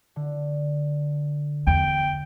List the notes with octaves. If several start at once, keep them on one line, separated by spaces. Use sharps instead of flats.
D3
E2 G5